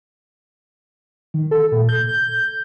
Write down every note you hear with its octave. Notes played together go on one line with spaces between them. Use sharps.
D#3
A4
A#2
G6
G6